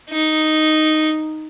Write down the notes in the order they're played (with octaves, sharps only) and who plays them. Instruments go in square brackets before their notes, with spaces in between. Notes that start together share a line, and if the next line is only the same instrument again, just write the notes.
[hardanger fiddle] D#4